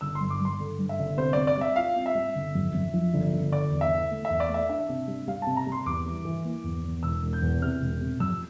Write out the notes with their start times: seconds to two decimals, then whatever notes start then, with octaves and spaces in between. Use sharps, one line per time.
0.01 G1 E6
0.15 C6
0.20 G2
0.30 D6
0.41 G2 C6
0.60 D3
0.79 G2
0.89 E5
0.99 G1
1.17 C3 C5
1.33 C4 D5
1.47 D5
1.57 G3 E5
1.76 F4 F5
1.96 C4
2.06 E5
2.15 G3
2.35 G1
2.55 F2
2.74 F2
2.94 F3
3.14 G1
3.33 G1
3.52 D3 D5
3.71 E2
3.81 E5
3.92 D3
4.11 A3
4.25 E5
4.30 E2
4.40 D5
4.49 A3 E5
4.69 D4 E5
4.89 C3
5.08 G3
5.28 G3 F5
5.42 C3 A5
5.57 A#5
5.66 G3
5.72 C6
5.86 E2 D6
6.06 E3
6.25 E3
6.45 A#3
6.64 E2
6.84 E2
7.03 E1 E6
7.23 E1
7.33 G6
7.42 E2
7.62 C3 F6
7.81 E1
8.01 C3
8.20 F2 E6